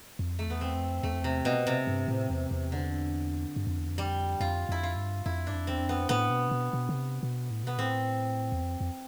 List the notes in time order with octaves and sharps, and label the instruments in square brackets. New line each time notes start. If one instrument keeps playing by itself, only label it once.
[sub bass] F2
[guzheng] A3
[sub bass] E2 [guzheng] B3
[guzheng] C4
[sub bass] F2
[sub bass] E2 [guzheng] A3
[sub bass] F2
[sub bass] E2 [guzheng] C3
[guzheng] B2
C3
[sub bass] G2
A2
E2
E2
[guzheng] D3
[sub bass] G2
F2
E2
F2
[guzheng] G3
[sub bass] F2 [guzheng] F4
[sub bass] F2 [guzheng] E4
[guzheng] F4
[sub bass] G2
[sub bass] F2 [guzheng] E4
[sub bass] G2 [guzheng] D4
[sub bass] F2
[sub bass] E2 [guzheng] C4
[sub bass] F2
[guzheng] B3
[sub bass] A2 [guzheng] B3
[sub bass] B2
C3
B2
B2
D3
C3
B2
A2
[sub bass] B2 [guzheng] B3
[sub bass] A2 [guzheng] C4
[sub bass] E2
F2
F2